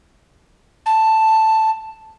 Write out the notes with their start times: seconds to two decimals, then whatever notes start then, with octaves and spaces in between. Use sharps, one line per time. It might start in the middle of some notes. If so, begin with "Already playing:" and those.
0.86 A5